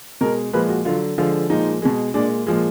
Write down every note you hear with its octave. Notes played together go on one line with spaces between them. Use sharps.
B2 G#3 A#4
A#2 F3 G#3 B4
F#4
D3 F#3 F4
D3 F3 G#3 F4
A#2 F3 G#3 D#4
B2 G#3
A#2 G#3 D4
A#2 F3 G#3